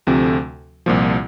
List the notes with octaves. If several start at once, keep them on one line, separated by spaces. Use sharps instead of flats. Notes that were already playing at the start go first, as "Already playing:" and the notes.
D2 C3 F3 A3 C4
C2 A#2 F3